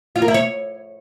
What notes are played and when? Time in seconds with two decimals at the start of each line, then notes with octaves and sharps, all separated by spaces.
0.16 F4
0.22 A#4
0.28 E4
0.34 C#5